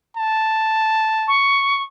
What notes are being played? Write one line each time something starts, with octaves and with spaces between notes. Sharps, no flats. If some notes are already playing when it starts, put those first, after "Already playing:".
A5
C#6